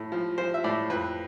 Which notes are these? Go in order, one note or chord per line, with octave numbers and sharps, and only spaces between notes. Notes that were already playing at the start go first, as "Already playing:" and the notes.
Already playing: A2
F3
F3 C5
E5
A2 D5
F2 B4